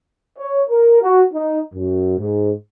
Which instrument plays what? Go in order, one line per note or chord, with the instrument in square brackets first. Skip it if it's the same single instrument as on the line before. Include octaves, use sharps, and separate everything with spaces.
[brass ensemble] C#5
A#4
F#4
D#4
F#2
G#2